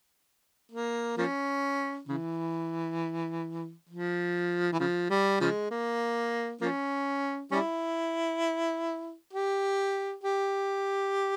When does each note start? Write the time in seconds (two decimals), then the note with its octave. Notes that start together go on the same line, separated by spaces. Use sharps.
0.72 A#3
1.18 F3 A#3 C#4
2.08 C#3 E3
3.89 F3
4.72 E3
4.80 C#3 F3
5.10 G3
5.41 C#3 F3 G#3
5.71 A#3
6.61 F3 A#3 C#4
7.52 G3 C#4 E4
9.33 G4
10.24 G4